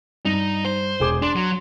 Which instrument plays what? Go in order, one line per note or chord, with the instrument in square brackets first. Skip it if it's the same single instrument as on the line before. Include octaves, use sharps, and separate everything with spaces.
[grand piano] G2 [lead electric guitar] D#4
[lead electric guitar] C5
[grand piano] E1 G#4 D6
[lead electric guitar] D4 [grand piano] C6
[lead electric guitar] F#3